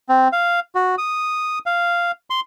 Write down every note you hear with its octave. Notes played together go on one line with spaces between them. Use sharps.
C4
F5
F#4
D#6
F5
C6